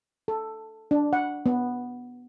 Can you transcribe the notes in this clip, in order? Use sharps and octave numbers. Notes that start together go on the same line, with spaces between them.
A4
D4
F#5
B3